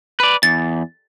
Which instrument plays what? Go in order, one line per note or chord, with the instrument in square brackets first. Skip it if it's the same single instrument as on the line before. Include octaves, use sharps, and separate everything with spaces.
[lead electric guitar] B4 D5
[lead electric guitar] E2 [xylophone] A6